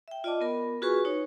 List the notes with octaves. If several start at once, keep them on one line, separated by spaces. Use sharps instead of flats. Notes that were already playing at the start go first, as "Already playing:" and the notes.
E5 G5
F4 D5 D#5 A5 D6
B3 A#4 B5
F4 F#4 G#4 B4 G#5 C#6
D#4 C#5